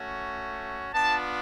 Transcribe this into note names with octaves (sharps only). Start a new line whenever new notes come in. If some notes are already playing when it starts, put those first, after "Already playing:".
Already playing: A3 C#4 F#4
B3 D4 F4 A5